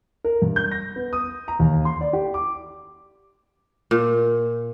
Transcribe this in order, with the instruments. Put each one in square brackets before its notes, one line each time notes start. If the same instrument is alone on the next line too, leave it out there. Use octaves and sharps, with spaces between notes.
[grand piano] A#4
G2
G6
A#6
B3
D#6
A#5
D#2
C6
D5
G4
D6
[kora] A#2